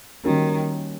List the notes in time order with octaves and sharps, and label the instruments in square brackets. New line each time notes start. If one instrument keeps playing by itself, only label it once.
[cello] D#3 [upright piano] G3 A#3 C#4 F#4 A#4